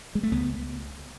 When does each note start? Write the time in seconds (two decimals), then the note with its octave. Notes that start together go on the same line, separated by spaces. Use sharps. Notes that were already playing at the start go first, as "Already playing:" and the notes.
0.15 G#3
0.23 A3
0.32 C#2 B3